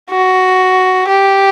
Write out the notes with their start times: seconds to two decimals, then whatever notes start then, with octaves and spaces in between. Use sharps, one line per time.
0.10 F#4
1.08 G4